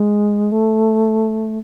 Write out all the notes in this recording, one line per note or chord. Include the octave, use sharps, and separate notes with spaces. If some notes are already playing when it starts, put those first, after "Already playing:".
Already playing: G#3
A3